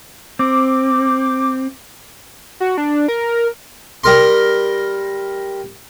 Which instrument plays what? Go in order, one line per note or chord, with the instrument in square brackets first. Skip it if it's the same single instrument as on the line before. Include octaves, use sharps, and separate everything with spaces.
[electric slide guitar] C4 [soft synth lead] D6
[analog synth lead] F#4
D4
A#4
[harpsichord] G3 A#4 C6